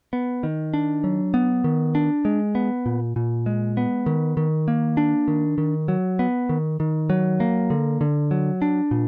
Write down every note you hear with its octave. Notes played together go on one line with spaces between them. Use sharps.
B3
D#3
D4
F#3
B3
D#3
D4
G#3
B3
A#2
A#2
G#3
B3
D#3
D#3
A#3
D4
D#3
D#3
F#3
B3
D#3
D#3
F#3
A#3
D3
D3
F#3
D4
A#2